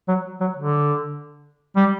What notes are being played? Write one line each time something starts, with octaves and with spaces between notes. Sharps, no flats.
F#3
F#3
D3
G3